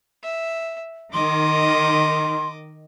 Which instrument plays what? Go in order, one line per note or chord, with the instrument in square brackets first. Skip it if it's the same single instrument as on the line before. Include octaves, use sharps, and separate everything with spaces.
[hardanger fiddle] E5
[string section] D#3 [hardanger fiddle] D#5 D6 [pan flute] C6